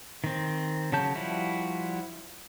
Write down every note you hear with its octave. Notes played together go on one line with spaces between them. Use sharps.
D#3 C4
C#3 F#3 A5 G6
F3 G3 E4 F#4